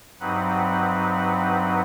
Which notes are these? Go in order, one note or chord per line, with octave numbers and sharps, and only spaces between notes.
G2 F#3 C4 D#4 B4 F#5